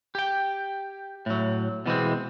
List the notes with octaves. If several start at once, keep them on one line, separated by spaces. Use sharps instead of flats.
G4 G5
A2 F#3
B2 E3 G#3 C4